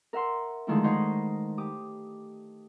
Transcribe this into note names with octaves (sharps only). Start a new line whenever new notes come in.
A#4 E5 F#5 C6
D3 D#3 F3 G#3 A3 E4
D#4 C5 C#5 D#5 F#5 B5
G4 D6 D#6